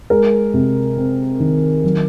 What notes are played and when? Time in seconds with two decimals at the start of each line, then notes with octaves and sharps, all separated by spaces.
0.10 G#3 A#4
0.54 C3
0.97 C4
1.40 D#3
1.84 F#3